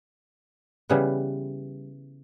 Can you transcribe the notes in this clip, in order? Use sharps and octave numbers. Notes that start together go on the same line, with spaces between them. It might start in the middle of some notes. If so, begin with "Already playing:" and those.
C#3 E3 G3 B3